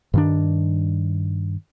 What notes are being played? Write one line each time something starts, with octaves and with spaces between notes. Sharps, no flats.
G2 D#3 D4